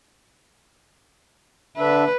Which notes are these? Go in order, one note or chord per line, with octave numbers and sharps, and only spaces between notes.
D3 D4 B4 E5